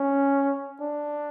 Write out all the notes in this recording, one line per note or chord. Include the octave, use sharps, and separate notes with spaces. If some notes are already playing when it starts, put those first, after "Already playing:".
Already playing: C#4
D4